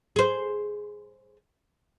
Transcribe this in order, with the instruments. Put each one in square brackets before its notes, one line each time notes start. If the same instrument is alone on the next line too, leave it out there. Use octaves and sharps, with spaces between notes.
[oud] G#4 C5